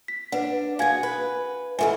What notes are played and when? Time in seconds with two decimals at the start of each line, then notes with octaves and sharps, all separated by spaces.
0.08 B6
0.32 D4 B4 F#5
0.79 F#4 G#4 F5 G#5 G#6
1.03 B4
1.79 G#2 D#3 E4 A4 E5 G#5